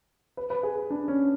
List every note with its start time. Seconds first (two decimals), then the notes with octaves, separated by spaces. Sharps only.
0.37 B4
0.50 B4
0.63 G#4
0.90 D4
1.08 C#4